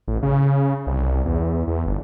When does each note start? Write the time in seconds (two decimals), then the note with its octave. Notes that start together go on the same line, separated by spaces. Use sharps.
0.08 A1
0.23 C#3
0.87 C2
1.25 E2
1.67 E2
1.86 G1